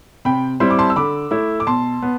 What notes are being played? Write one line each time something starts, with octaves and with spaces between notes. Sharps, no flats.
C3 G5 B5
G3 C4 E4 C6
D6
A5 C6
E6
D3 B5 D6
A3 E4
D6
B2 A5 C6
B3